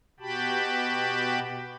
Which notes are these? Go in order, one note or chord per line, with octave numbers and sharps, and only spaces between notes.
B2 F#4 G4 G5 A5 B5